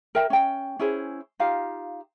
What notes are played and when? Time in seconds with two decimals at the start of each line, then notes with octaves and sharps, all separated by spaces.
0.15 A#4 E5 G5
0.30 C#4 G5
0.79 C#4 E4 G#4 C5
1.40 D#4 F4 G4 F5